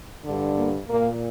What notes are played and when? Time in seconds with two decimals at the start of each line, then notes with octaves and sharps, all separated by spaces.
0.25 G2 D3
0.57 A#3
0.89 A#2 A#3